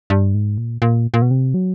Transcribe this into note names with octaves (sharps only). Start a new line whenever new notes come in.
G2
G#2
A#2
A#2
A#2
B2
C3
F#3